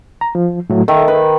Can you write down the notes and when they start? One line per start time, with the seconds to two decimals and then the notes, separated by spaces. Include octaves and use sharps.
0.21 A#5
0.35 F3
0.70 A2 F#3 A3
0.88 D#3 A4 E5
1.08 B4